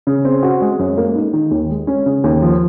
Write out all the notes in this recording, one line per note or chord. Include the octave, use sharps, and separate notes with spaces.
C#3
C4
F#4
G#3
F#2
A#3
D#4
D#3
D#2
G#3
C#4
C#3
D#2
F3